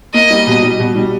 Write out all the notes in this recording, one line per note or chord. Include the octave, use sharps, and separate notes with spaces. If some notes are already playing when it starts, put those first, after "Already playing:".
A#3 D#5
G3
B2
G3
B2
G3